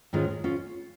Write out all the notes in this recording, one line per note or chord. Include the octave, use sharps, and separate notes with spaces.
G#2 D#3 G#3 C#4 F4
C#4 F4